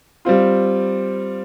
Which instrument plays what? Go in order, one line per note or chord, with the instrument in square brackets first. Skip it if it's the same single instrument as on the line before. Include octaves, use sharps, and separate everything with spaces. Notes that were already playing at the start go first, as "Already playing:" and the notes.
[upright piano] G3 C4 F4